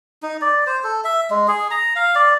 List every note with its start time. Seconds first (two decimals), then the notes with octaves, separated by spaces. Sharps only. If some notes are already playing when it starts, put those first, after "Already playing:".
0.23 D#4
0.41 D5
0.67 C5
0.84 A4
1.04 E5
1.31 G#3
1.48 G#4
1.71 A#5
1.96 F5
2.15 D5